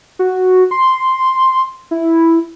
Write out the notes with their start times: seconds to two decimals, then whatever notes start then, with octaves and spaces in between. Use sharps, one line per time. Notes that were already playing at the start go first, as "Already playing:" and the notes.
0.19 F#4
0.71 C6
1.91 E4